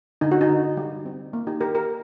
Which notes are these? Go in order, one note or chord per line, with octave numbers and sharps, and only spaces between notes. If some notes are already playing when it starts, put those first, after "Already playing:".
D3 D#4
F#4
D#4
D3
G3
C4
A#3
D#4 G4
D#3 G4 A#4
G4 A#4